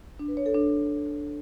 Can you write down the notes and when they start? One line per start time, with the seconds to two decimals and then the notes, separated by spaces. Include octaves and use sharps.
0.19 D4
0.28 B4
0.37 C#5
0.46 A4
0.55 D4